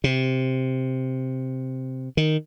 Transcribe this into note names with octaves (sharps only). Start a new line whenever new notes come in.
C3
D#3